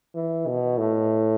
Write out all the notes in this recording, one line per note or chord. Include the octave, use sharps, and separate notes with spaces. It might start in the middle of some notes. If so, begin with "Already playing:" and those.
E3
B2
A2